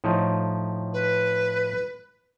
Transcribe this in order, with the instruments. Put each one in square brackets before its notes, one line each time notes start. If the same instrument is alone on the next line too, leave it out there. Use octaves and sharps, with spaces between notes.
[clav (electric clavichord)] A2 F3 D#4
[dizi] B4